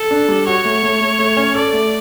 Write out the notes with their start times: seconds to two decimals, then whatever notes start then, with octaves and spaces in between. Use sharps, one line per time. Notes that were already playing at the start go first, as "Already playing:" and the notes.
Already playing: A4
0.11 D4
0.28 G3
0.46 F#4 C#5
0.65 A3
0.83 A3
1.01 A3
1.19 A3
1.37 C#4
1.55 A4 D5
1.73 A3